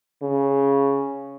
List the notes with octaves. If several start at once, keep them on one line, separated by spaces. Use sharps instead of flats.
C#3